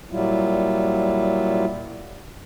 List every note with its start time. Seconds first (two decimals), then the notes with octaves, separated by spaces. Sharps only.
0.11 A#2 F#3 G3 E4 F4